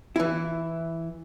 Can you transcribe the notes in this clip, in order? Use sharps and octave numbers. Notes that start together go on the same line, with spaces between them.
E3 E4